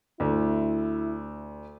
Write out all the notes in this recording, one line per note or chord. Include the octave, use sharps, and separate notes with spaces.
D2 E4